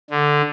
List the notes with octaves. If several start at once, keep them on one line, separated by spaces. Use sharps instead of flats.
D3